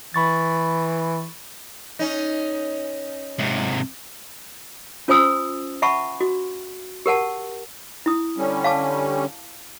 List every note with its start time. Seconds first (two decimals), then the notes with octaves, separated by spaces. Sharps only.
0.14 E3 B5 C#6 A6
1.99 C#4 D#4
3.39 G#2 C3
5.08 C#4 F4 C5 G#5 D#6 E6
5.82 E5 F#5 A5 B5 C#6
6.21 F#4
7.06 G4 A#4 F#5 A5
8.06 E4 D#6
8.37 D3 G3 C#4
8.64 F5 A5 D6